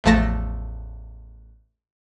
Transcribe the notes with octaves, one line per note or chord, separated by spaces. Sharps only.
A1 E2 F3 A3 A5 A#6